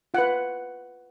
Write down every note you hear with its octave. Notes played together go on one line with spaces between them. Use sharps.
F4 B4 F#5